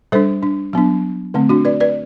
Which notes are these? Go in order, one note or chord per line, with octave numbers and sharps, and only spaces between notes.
G3 D4 A4 C5
D4
F#3 B3 D4
D3 A3 C4
D4 F#4
B4 D5
B4 D5